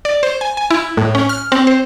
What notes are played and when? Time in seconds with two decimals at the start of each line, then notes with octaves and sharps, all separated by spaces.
0.05 D5
0.23 C5
0.41 G#5
0.57 G#5
0.71 E4
0.97 A2
1.15 C#4
1.29 F6
1.52 C4
1.67 C5